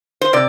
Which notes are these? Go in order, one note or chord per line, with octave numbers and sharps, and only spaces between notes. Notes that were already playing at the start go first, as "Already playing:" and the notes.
C5
C3 D5